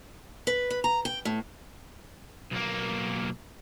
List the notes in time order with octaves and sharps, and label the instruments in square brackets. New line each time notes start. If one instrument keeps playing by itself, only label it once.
[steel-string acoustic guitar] B4
B4
A#5
G5
A2
[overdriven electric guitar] B1 A#3